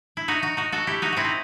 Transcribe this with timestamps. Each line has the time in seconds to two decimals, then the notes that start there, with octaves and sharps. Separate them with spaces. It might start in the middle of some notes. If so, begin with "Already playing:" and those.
0.17 E4
0.28 D#4 F#4
0.42 D#4 F#4
0.57 D#4 F#4
0.72 F#4 A4
0.87 E4 G4
1.02 D#4 F#4
1.12 C4 E4 F#4
1.25 D#4